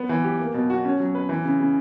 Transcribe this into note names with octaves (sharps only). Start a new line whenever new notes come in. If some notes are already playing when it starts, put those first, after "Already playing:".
Already playing: B3
E3
G4
A#3
B2
F#4
C#4
F#3
B4
E3
C#3
C#3